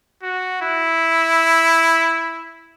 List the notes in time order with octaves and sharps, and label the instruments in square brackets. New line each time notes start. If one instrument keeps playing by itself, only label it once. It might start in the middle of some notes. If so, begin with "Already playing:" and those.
[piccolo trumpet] F#4
E4